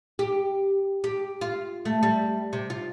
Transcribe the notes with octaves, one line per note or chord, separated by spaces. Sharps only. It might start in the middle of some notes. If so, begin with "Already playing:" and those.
G4
G4
F4
A3
G3
C3
F4